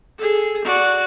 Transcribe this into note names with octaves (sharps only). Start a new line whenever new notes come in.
G#4 A4
F#4 D5